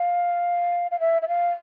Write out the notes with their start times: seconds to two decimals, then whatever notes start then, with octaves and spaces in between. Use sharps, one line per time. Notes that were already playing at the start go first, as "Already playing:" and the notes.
Already playing: F5
0.91 F5
0.99 E5
1.22 E5
1.28 F5